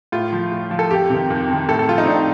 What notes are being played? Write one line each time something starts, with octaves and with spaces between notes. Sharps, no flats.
A2 F4
F3
A2
F3
A4
F2 G4
C3 D#3
F2
C3 D#3
A2 A4
A4
F3 F4
D#4
C4
A2 D4